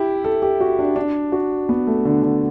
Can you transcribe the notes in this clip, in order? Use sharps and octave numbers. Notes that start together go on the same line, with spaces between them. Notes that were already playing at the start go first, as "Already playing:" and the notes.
Already playing: E4 G4
A4
G4
F#4
D4
D4
F#4
B3
A3
D3
D3